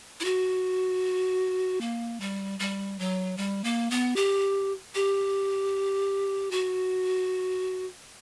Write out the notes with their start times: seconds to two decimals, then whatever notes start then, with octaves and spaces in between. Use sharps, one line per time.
0.20 E4
0.25 F#4
1.81 A#3
2.20 G3
2.60 G3
2.99 F#3
3.37 G3
3.64 A#3
3.91 B3
4.16 G4
4.95 G4
6.51 F#4